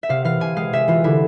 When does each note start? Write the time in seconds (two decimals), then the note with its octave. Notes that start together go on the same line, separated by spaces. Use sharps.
0.03 E5
0.09 C3 F5
0.25 E3 F5
0.40 C3 G#5
0.57 G#3 F5
0.73 C3 E5
0.88 E3 F4
1.04 D3 E4